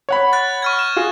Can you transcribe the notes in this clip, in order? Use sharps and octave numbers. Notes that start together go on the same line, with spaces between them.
C#5 F#5 B5
F#6 A6
C#6 F6 G#6
E7
F4 F#4 G#4